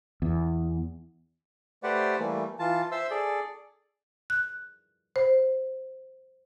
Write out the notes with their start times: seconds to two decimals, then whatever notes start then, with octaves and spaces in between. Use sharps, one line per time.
0.22 E2
1.83 A3 G4 B4 C5 D5 F#5
2.19 E3 G3 A3 A#3
2.59 E3 F4 A5
2.91 C5 E5 C6 E6
3.10 G#4 A4 D5
4.30 F#6
5.16 C5